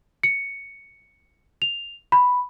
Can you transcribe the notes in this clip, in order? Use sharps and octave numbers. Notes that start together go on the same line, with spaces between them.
C#7
F7
B5